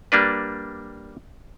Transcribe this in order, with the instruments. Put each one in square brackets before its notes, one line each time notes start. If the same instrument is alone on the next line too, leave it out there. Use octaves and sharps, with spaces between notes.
[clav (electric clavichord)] G3 A#3 D4 B4